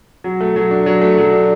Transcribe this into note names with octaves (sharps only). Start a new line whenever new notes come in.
F#3
A3
F#3
D4
F#3
A3
F#3
D4